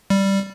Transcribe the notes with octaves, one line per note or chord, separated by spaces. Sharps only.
G3